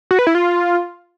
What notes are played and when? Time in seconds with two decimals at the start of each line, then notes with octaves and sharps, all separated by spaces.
0.11 F#4
0.19 B4
0.27 E4
0.35 F4